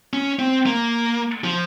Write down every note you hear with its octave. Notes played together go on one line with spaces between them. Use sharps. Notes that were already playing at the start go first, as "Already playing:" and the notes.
C#4
C4
A#3
F3